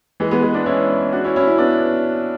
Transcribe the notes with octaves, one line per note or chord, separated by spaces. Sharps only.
E3 G#3
G#3 B3
G#3 B3
B3 D4
C#4 E4
D4 F#4
C#4 E4
C#4 E4
C#4 E4
B3 D4